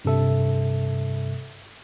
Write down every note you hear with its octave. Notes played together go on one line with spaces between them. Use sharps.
G2 C3 A4 E5